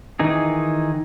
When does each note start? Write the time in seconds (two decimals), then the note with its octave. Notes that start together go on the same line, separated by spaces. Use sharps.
0.20 D#3 E3 D#4 G#4